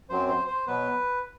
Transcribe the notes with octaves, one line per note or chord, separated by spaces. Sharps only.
F#2 F#3 C4 C5
C5
C5
B2 F#3 B3 B4